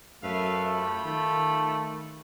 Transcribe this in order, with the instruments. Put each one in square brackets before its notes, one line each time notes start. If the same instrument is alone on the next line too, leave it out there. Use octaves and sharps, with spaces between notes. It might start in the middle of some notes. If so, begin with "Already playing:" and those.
[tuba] F#2 [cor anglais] A3 [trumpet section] B4 E5 F5
[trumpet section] F4 G4 B5
[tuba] D#3 [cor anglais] A3